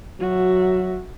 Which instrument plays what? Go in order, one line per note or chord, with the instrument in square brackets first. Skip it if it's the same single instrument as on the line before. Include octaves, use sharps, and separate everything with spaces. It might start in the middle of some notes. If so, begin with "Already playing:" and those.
[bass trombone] F#3 [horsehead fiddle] F#4 E5